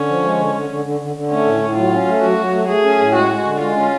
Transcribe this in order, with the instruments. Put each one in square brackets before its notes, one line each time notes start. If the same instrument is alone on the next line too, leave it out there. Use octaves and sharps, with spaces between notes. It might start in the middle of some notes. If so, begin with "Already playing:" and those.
Already playing: [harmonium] D3 [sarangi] C#4
[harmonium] F3
G#3
D3
D3
D3
D3
D3
D3
[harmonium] A3 [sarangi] C#4
[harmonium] A2
A2
[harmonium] F#3 [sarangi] F4
[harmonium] C#4
A3
[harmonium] F#3 [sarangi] F#4
[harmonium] F#3
A3
[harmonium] A3 [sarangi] G#4
[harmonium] C#4
A2
[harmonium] G#3 [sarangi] F#4
[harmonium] G#3
D3
[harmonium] G#3 [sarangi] F4
[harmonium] C#4